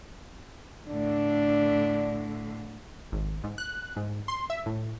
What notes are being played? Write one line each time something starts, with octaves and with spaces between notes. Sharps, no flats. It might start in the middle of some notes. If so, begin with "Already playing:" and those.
A2 D3 D4
G#1
G#2
F#6
G#2
C6
E5
A2